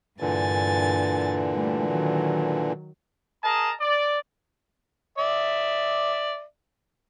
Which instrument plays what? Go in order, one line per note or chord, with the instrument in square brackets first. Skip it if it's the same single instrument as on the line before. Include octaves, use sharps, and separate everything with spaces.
[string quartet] G2 G#5 A6 [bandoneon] A#2 D3 E3
[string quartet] G3 A3
D#3 F#3
[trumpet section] G#4 A#4 D#5 A5 A#5
D5
[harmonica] D5 E5